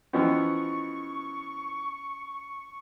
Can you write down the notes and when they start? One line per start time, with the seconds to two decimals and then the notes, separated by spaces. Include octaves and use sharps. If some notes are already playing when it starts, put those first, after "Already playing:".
0.13 E3 F3 B3 C#4 F#4 D#5 C#6